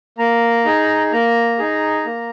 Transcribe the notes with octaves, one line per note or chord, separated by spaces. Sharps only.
A#3 A#5
D#4 G#4
A#3 A#5
D#4 G#4
A#3